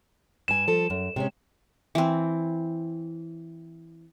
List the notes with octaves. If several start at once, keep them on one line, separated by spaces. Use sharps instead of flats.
G2 G#5 E7
F3 A4
F#2
C3 G#3 C#4
E3 C4